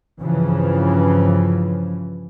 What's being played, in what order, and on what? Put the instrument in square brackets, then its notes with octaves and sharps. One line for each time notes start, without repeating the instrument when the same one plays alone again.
[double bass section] G2 C#3 E3 F3